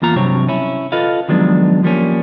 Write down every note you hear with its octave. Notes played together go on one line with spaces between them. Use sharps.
E2 A#3 F4 A#5
G2 C3 F#3 C4 C#5
C#4 E4
F4 A4 B4 D#5 F5
D#3 F3 F#3 G#3 B3 D4
F3 G3 A#3 C#4